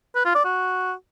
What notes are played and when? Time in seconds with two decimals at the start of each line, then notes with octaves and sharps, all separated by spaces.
0.15 B4
0.25 F4
0.35 D5
0.45 F#4